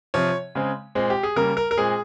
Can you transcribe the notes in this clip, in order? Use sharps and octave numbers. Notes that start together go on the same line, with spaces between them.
C3 F3 C4 C#5
C#3 G#3 C4
A#2 G#3 C4
G4
G#4
C#3 G3 A#3 A#4
A#4
A#4
A#2 G#3 C4 G#4